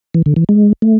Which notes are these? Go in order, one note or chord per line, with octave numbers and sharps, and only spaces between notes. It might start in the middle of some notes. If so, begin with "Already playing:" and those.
E3
D3
E3
G#3
A3